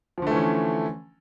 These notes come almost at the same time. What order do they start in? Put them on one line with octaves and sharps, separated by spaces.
F3 D3 A3 E3 C#4